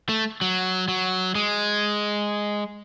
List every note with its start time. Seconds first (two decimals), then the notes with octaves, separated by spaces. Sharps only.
0.09 A3
0.41 F#3
0.88 F#3
1.35 G#3